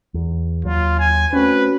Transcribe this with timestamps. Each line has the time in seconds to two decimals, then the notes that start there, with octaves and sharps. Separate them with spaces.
0.14 E2
0.65 D#2 F#3 F4
0.99 G#5
1.33 A3 C4 C#4 F#4 B4